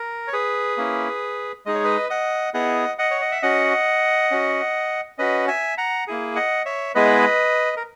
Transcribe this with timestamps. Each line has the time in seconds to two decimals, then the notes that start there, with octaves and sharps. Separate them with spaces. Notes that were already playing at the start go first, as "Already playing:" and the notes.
Already playing: A#4
0.27 C#5
0.33 G#4 B4
0.77 A#3 C#4 E4
1.66 G#3 D#4 G#4 D#5
1.74 C#5
1.84 B4 D#5
2.10 D#5 F#5
2.54 B3 E4 G#4 D#5 F#5
2.99 D#5 F#5
3.11 C#5
3.21 D#5
3.32 E5
3.42 C#4 F#4 D#5 F#5
4.31 C#4 F#4
5.18 C#4 F#4 B4 D#5
5.48 E5 G#5
5.78 F#5 A#5
6.07 A#3 E4 G#4
6.36 D#5 F#5
6.66 C#5 E5
6.95 G#3 B3 E4 G#4 B4 D#5
7.77 A#4